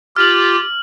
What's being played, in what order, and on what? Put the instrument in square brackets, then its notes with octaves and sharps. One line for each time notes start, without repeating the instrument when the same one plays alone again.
[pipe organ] F4 G4 [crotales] F6 F#7